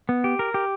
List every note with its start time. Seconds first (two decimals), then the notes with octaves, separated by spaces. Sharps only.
0.09 B3
0.24 G4
0.39 A#4
0.54 G4